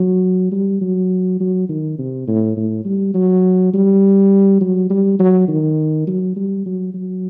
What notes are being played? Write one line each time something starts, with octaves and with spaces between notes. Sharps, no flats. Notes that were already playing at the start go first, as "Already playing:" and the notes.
Already playing: F#3
G3
F#3
F#3
D#3
C3
A2
A2
G3
F#3
G3
F#3
G3
F#3
D#3
F#3
G3
F#3
F#3